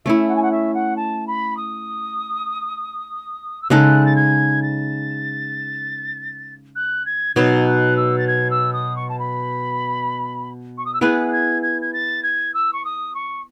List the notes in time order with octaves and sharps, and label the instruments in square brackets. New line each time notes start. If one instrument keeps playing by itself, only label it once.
[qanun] A3 C#4 E4 [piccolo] E5
[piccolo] F#5
G#5
F#5
E5
F#5
A5
B5
D#6
E6
[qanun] C#3 G#3 D#4 A4 [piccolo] F#6
[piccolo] A6
G#6
A6
F#6
G#6
[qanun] B2 F#3 B3 D#4 [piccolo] G#6
[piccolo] F#6
E6
A6
G#6
E6
D#6
C#6
A5
B5
C#6
D#6
E6
[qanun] B3 E4 G#4 B4 [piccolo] F#6
[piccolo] F#6
G#6
G#6
G#6
A6
G#6
E6
C#6
D#6
C#6